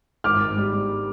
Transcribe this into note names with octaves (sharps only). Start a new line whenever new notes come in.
G#1 D6 F6
G#2
G3
G3